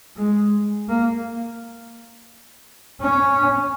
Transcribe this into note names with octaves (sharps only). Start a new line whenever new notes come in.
G#3
A#3
C#4